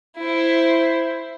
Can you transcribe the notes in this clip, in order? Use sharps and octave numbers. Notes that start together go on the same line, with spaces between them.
E4 C5